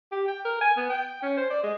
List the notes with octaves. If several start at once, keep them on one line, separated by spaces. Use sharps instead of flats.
G4
G5
A#4
G#5
B3
G5
C#4
C5
D5
G#3